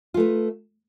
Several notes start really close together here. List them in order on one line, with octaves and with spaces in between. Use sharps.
F4 A3 B4